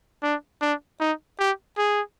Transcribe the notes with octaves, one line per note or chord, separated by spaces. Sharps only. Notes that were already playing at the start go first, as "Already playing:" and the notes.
D4
D4
D#4
G4
G#4